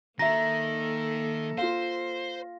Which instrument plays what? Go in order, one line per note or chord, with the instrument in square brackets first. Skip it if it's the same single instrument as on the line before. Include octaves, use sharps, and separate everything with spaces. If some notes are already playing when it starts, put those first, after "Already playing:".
[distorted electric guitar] D#3 [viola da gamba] A#3 A4 [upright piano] E5 A#5 [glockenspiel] A#6
[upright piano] F4 F5 [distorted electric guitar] C5